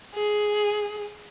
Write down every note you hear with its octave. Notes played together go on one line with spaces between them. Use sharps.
G#4